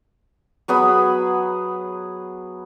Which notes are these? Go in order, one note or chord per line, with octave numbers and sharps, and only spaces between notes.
F#3 B3 G#4 B5